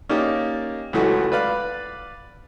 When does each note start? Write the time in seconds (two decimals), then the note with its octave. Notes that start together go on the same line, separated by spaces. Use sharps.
0.09 A#3 C#4 D#4 G4 D5
0.93 C#2 E3 F#3 A3 F#4
1.32 B4 D5 F5 B5 F#6